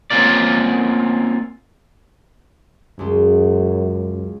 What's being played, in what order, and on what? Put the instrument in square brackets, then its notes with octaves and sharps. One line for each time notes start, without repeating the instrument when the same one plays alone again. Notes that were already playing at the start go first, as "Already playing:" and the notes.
[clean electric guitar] A#3 C4 C#4 F4 A#4 D5
[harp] C#2 G#3 [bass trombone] F#2